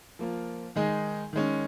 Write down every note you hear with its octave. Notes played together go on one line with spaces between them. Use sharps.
F3 A#3 F4
D#3 G#3 D#4 G#4
D#3 G#3 C#4